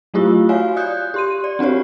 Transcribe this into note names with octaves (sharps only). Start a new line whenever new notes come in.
F#3 A3 E4 F4 G4
F#4 C#5 F5 G#5
D5 D#6 F#6 G6
G4 C6 D#7
D5
C4 D4 F#4 G4 C#5